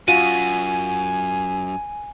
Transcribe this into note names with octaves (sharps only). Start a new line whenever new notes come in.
F#2 F4 F#4 G#5 D#7